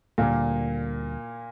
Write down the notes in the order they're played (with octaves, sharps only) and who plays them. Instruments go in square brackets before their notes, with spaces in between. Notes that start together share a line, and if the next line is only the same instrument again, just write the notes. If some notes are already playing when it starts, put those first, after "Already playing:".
[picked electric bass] D2 D3 G3 [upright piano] A#2 A#3